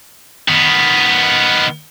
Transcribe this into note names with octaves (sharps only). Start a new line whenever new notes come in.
D#3 B3